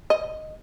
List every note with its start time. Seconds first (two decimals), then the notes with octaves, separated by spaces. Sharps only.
0.10 D#5